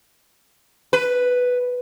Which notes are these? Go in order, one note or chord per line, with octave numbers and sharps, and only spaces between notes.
B4